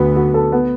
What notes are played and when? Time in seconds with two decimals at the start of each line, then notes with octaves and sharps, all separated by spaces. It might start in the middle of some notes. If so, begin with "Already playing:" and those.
Already playing: D2 D3 B3 F#4
0.16 F#4
0.34 A4
0.52 B3